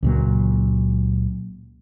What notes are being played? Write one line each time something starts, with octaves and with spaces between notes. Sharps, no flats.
C#2 A#2 F#3